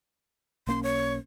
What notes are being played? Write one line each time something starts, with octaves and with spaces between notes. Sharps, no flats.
B1 A#3 C#4 C6
C#5